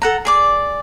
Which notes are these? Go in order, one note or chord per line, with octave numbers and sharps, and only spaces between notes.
A4 F#5 A#5
G#4 D5 D6